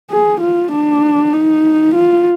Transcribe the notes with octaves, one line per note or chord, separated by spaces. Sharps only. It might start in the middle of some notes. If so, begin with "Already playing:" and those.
G#4
F4
D4
D#4
F4